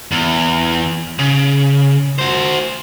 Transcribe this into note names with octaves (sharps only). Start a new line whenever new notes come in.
E2
C#3
F#4 C5